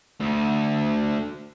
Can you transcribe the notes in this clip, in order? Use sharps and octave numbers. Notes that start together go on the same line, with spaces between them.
D2